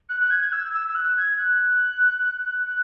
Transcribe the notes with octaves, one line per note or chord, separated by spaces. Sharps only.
F#6
F#6
G#6
E6
E6
E6
F#6
G#6
F#6
F#6